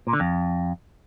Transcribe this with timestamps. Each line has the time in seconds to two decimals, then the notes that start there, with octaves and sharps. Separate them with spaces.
0.07 A#2
0.13 D3
0.20 F2